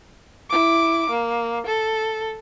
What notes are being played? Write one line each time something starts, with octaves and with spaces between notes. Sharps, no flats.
E4 D6
A#3
A4